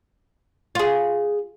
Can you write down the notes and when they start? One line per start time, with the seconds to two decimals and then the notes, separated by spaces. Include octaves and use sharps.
0.75 F4 G#4